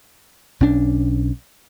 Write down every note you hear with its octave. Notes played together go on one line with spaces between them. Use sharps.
B1 C#4 D4